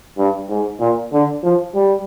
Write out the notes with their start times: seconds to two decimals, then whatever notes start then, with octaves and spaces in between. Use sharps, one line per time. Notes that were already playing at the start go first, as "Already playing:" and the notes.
0.18 G2
0.49 G#2
0.80 A#2
1.12 D3
1.44 F3
1.75 G3